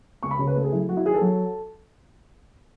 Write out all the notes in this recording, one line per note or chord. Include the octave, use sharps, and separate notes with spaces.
C#2 C#6
B5
C#3 C#5
B4
A3 A4
G#4
F#3 E4
F#3 F#4
E4
D#3 G#4
A4
F#3